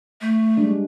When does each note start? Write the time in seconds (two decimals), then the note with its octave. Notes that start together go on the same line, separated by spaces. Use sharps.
0.21 A3
0.57 G3 G#3 D4